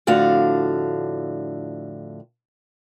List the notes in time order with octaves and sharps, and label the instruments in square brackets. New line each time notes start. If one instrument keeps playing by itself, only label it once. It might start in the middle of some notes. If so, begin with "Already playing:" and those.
[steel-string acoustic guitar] F2 A2 D3 F#4 F5